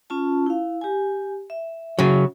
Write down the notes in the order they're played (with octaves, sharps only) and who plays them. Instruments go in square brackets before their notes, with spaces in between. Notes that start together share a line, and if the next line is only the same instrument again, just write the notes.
[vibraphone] C#4 F4 A5
E4 F5
G4 G#5
E5
[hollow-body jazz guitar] C#3 F#3